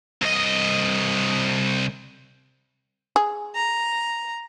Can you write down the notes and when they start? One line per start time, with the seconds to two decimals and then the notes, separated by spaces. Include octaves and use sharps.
0.22 C2 D#5
3.16 G#4
3.55 A#5